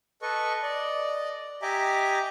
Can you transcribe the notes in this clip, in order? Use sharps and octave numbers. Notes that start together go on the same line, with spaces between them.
A4 B4 D#5 C#6
D5 D#5
G4 D#5 E5 G#5 A#5 D6